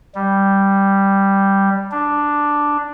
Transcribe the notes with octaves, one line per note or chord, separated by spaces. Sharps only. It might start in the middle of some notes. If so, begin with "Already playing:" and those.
G3
D4